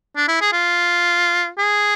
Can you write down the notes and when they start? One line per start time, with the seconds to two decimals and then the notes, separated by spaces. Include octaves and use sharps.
0.16 D4
0.28 E4
0.41 G#4
0.53 F4
1.59 G#4